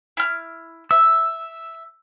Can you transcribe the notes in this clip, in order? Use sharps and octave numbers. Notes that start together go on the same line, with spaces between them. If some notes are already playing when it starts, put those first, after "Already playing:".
E4 F6
E5 E6